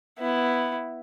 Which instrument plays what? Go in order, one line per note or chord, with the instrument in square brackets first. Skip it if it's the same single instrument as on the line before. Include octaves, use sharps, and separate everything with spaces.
[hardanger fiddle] B3 E4